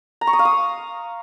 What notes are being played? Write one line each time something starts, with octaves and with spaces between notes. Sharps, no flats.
A#5
C#6
D#6
F5
D#6